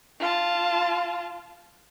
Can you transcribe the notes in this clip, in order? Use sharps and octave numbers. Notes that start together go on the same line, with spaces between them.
F4 A5